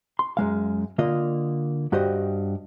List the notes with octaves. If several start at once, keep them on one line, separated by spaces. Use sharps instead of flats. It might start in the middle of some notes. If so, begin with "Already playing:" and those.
C6
F#2 G#3 F5
D3 A#3 F4 D#5
G2 F#4 G4 C5 D#5